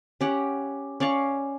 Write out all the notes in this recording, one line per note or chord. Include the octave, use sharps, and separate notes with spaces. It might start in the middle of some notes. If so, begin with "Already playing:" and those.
C#4 G4 F#5
C#4 D5 F5 C#6